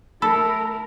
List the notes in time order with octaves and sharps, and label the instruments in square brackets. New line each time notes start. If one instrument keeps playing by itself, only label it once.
[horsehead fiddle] A3 A#4 [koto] A4 [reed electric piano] B5 E6